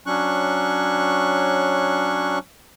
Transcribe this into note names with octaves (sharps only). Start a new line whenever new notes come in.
F#3 C#4 D4 C#6 F#6